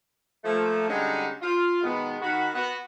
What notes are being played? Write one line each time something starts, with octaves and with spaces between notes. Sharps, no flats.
F3 A3 A#3
D3 G3 G#3 C#4 D#4 F#4
F4
B2 D#3 G#3 B3
D#3 F#4 B5
B3 F#4